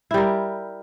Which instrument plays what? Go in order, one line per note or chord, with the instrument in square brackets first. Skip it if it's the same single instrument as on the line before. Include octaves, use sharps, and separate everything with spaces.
[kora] E4
G3
A#4